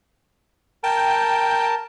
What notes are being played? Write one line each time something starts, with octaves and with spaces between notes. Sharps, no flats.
A#4 G5 A5